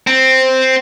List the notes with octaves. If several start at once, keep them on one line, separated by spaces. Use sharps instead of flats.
C4